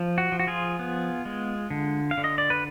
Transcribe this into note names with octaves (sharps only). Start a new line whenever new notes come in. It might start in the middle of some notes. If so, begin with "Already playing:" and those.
Already playing: F3
F#4
F3
F#4
F4 G#4
B3
G#3
D3
F5
D3
D#5
D5
B4